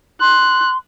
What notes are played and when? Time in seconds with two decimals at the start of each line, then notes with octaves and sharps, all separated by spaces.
0.21 C6 F#6